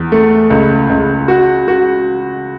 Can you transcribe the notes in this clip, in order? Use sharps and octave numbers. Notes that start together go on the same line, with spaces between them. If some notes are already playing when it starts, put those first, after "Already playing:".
Already playing: E2
A3
C#2
C#2
F#4
F#4